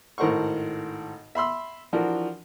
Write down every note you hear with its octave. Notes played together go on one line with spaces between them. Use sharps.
G#1 A2 A#4 C5 F#5 C#6
E5 B5 C6 E6
E3 F3 D4 F#4 A#4